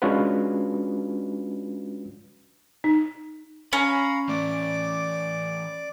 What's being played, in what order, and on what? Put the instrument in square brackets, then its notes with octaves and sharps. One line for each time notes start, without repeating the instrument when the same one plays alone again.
[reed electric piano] G#3 C#4 D4 F4 F#4 B4
[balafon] D#4
[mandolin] C#4 [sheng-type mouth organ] F5 A#5 [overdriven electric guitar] B5
[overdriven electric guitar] E3 A3 [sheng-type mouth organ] D5 D6